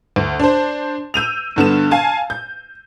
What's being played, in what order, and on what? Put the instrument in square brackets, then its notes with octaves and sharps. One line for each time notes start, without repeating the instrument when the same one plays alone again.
[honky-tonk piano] D2
D4 C5
E6 G6 D#7 F7
G2 D3 B3 E7
F5 G#5 A5
G6